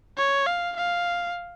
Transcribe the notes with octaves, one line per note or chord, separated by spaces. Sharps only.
C#5
F5
F5